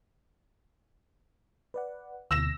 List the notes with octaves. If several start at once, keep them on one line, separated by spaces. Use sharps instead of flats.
B4 D5 F#5
D2 B2 E6 A#6 E7